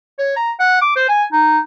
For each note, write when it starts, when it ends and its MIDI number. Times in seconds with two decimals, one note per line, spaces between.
0.19 0.32 73
0.36 0.51 82
0.60 0.77 78
0.82 0.93 86
0.96 1.06 72
1.09 1.24 80
1.33 1.59 63